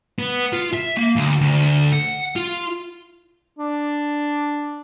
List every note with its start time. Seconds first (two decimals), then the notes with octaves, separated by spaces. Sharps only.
0.19 B3
0.53 F4
0.74 E5
0.97 A#3
1.16 D2
1.41 D2
1.92 F#5
2.36 F4
3.59 D4